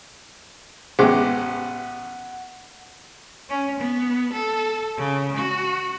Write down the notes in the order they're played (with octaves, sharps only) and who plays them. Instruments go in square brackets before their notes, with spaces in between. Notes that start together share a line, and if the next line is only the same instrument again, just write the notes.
[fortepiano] A1 G#3 D6 [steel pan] B3 G4 C5 [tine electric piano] F#5
[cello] C#4
B3
A4
C#3
F#4